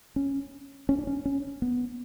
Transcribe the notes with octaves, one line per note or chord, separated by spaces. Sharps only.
C#4
C#4
D4
C#4
C#4
B3